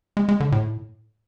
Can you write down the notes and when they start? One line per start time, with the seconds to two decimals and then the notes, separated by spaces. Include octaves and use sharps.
0.17 G#3
0.29 G#3
0.40 D3
0.52 A2